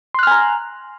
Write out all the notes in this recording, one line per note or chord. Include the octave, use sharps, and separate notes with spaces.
G#5 A#5 C6 F6 F#6